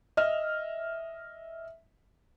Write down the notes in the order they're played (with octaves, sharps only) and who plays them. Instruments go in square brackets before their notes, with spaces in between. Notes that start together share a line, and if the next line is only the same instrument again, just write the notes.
[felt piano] D#5 E5 F6